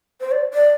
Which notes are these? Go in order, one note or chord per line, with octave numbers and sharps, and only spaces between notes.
C5
D5
D5